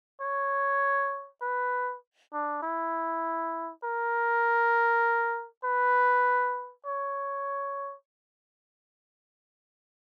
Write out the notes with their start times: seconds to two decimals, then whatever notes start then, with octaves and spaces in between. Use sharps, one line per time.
0.21 C#5
1.42 B4
2.33 D4
2.62 E4
3.84 A#4
5.64 B4
6.86 C#5